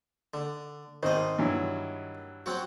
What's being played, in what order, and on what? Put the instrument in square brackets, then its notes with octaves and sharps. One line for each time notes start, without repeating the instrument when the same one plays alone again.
[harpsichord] D3
[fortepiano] G#1 C5 [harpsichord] D#3 D#5
[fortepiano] G2 E3 F#3
[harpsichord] F#3 C4 F#4